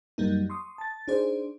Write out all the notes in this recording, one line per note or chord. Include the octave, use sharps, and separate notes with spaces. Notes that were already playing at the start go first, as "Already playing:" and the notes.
F#2 F#3 G3 A#3 D#4
C6 C#6 D#6
A5 A6
D4 D#4 G#4 C5 D5